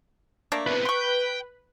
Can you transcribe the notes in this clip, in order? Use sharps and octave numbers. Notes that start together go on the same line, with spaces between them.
A3 A#3 D4
E2 C3 B4
G5 C6 C#6